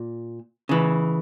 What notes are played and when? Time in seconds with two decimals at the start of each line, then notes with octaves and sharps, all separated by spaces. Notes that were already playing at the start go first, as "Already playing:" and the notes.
Already playing: A#2
0.69 C#3 E3